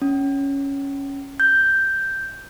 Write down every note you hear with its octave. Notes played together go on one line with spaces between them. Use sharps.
C#4
G6